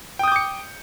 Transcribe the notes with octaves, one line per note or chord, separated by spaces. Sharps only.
G5 D6 D#6 G6 C#7